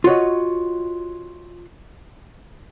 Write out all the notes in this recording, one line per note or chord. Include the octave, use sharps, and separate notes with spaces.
F4 F#4 C#5 D#5